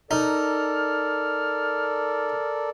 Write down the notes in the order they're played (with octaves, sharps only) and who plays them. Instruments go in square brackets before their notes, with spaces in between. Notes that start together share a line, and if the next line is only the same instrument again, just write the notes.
[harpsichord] D#4 [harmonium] A4 A#4 D5 [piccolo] F6